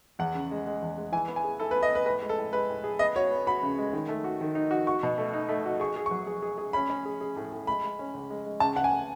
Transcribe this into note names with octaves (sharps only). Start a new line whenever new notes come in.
E2 F#5
C#3
G#3
G#3
E2
G#3
E3 G#5
B3
G#5
G#4
E4 A4
B4
B3
D#5
B3 B4
A2 B4
G#3
A4
A2
G#3 B4
A2
G#4
B3 D#5
F#4 C#5
B3
F#4 B5
C#3
G#3
D#3
A3
F#4
D#3
D#4
F#4
F#4 C#6
B2
A3
D#4
A3
F#4
G#4 C#6
G#4
F#3 C#6
G#4
G#4
G#4
C#4 B5
C#4
G#4
G#4
A2
A2
G#3 B5
G#3
C#4
C#2
G#3
G#3
C#2 A5
C#2 F#5
G#5